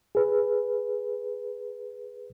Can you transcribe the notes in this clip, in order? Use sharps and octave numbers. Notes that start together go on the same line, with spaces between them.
G#4 B4